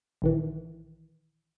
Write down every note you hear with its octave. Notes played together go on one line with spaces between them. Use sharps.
A#1 D#3 E3